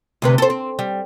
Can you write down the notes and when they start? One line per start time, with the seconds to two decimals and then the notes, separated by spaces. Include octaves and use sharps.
0.22 D2 C3 B4
0.38 A4 C5
0.50 C4
0.79 G3